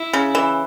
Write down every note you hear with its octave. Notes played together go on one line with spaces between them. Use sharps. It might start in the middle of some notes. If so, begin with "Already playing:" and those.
Already playing: E4
C#3
E3